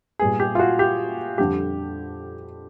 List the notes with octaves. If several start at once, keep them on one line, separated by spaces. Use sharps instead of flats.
A#2 G3 B3 G#4
G4
F4
F#4
G4
F2 D3 G3 G4